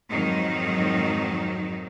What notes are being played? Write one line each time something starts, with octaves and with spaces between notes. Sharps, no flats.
F2 G#2 D#3 F#3 D#4